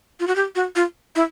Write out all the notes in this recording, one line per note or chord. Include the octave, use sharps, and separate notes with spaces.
F4
F#4
G4
F#4
F4
E4